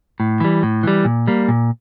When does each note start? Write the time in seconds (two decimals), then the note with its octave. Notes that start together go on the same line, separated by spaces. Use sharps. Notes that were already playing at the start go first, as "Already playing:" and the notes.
0.20 A2
0.40 E3 G3
0.63 A2
0.83 E3 G3
1.05 A#2
1.28 G3 A#3
1.48 A#2